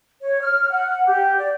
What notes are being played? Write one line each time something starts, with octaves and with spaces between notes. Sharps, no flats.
C#5
F6
F#5
G4
D5